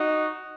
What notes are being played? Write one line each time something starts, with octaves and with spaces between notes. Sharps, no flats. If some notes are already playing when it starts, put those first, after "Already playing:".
Already playing: D#4 F#4